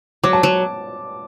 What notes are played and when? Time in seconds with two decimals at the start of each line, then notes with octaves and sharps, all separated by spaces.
0.23 F#3 D6
0.33 A5
0.43 F#3